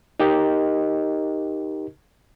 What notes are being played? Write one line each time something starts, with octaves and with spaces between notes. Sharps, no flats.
D#4 G4 A#4 D#5